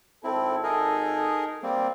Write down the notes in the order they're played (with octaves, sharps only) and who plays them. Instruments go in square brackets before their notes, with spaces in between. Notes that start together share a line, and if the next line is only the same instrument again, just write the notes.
[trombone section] G#1 A4 [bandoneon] C4 E4
[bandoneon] D#4 G#4 A#4
G3 A#3 C4